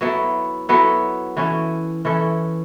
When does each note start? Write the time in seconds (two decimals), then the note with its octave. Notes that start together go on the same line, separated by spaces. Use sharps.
0.01 F#3 B3 E4 A4
0.69 F#3 B3 E4 A4
1.37 E3 C#4 A4
2.05 E3 C#4 A4